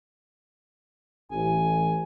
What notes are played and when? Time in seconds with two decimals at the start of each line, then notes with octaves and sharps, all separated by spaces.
1.31 A1 G#5